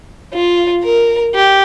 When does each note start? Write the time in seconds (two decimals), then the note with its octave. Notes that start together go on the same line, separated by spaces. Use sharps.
0.34 F4
0.84 A#4
1.35 G4